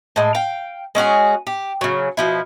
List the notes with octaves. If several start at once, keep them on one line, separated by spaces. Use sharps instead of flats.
A2 G#3
F5 G5
G#3 C#4 F#4 G#4
G4
C#3 F#3
B2 F3 E4